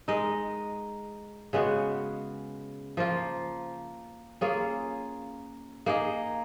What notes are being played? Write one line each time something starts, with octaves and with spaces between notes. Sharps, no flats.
G#3 D#4 A#4 D#5
C#3 G#3 B3 F#4
F3 A#3 F4
A#3 C#4 F4 G#4
A#3 D#4 G#4 D#5